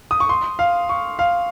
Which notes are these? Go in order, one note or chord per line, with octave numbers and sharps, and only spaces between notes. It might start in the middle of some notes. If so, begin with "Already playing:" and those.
D#6
C#6
C6
F5
C#6
F5